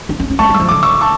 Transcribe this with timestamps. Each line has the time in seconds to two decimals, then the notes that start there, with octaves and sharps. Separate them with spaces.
0.09 D4
0.20 C#4
0.30 C#4
0.39 A3 A5 C#6
0.49 G3
0.54 E6
0.60 F3
0.69 D3 D6
0.83 C#6 E6
1.01 A5 C#6